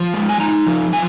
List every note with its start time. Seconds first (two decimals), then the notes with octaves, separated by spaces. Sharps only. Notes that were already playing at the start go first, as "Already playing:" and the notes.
Already playing: F3
0.14 G#3
0.29 G#5
0.40 D#4 A#5
0.67 F3
0.93 F3 G#5